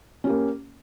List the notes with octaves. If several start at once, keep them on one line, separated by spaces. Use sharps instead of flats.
A#3 C#4 G4